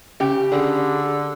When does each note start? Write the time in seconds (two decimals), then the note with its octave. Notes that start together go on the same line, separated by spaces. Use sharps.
0.20 C#3 G4
0.52 D3 G#4